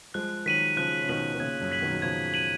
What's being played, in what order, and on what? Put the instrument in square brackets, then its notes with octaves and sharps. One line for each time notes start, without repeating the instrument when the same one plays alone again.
[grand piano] F3 G#3 [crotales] F#6
[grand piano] D#3 F#3 [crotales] B6 D#7 F#7
[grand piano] C#3 F3 [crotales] F#6
[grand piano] C#3
[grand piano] B2 D#3 [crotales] B6 D#7 F#7
[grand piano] D#3
[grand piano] A#2 C#3 [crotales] G#6
[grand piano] F#2
[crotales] B6 D#7 F#7
[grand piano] B2 D#3
F#3
[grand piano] C#3 F3 [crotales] G#6
[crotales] B6 D#7 F#7